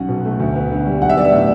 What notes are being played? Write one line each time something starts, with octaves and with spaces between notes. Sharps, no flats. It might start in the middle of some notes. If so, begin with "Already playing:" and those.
Already playing: B1 C#4 F#5
B2
A3
D2
B3
D3
G3
B1 F#5
E5
B3 D5
E5
A2 D5